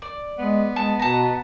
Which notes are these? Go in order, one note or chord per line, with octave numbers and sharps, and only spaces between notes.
D5
G#3 B3
G#3 A5
B2 A5 A#5